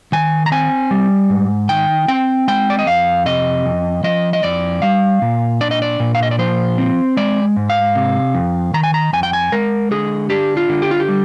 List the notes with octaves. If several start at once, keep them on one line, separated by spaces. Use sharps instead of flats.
D#3 G#5
A#5
C4 G#5
G3
G#2
D#3 G5
C4 G5
G#3 G5
D5
D#5
F2 F5
C3 D#5
F2
F3 D#5
D#5
F2 D5
G3 F5
A#2
D4 D5
D#5
D5
A#2
F5
D#5
D5
F3 C5
C4
G#3 D5
G#2
F5
C3
F2
D#3 A#5
G#5
A#5
F2 G#5
G5
G#5
G#3 A#4
D3 G#4
D4 G4
F4
D3
G4
F4
G4
G3